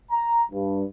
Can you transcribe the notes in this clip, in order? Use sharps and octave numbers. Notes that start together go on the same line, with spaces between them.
A#5
G2